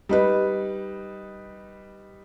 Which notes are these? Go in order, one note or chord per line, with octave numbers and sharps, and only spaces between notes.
G3 D#4 B4